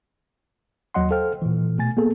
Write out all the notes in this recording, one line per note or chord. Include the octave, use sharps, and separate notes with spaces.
D#2 F#3 D#5 F#5 C6
A4 C5 F5 G5 F6
A#2 E3
B2 A3 G#5 A6
A#3 B3 G#4 A4